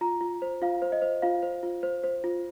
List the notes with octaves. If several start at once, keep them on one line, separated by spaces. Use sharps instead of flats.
F4 A#5
F4
C5
F4 F5
C5
D#5
C5
F4 F5
C5
F4
C5
C5
F4